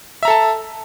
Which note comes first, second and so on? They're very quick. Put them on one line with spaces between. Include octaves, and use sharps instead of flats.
E5 A#5 A4 A5